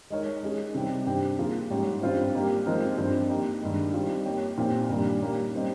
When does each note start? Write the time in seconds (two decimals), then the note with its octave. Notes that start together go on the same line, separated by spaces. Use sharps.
0.10 G#3 D#4 A#4 C#5
0.43 G#3 C#4 G#4
0.74 C3 G3 C4 G4
1.06 G2 G3 C4 G4
1.39 F3 A#3 F4 G#4
1.70 G#2 G3 C#4 G4
2.02 G2 G3 C4 F4 C5
2.34 G3 A#3 D#4 G4 A#4
2.66 F3 G#3 C4 G4 A#4
2.98 G2 F3 C4
3.30 A#3 D#4 G4
3.62 G2 D#3 G#3
3.94 G3 C4 F4
4.25 A#3 D#4 G4 C#5
4.57 A#2 F3 C4 G4
4.89 G2 D#3 G3 A#3
5.21 G3 A#3 C#4 G4
5.54 G3 C4 D#4